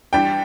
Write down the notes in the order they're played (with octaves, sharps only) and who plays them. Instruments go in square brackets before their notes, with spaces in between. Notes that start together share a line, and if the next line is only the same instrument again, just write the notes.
[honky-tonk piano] G2 E3 G3 D4 G4 [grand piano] G5